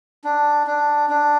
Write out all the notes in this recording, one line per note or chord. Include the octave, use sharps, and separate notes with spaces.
D4
D4
D4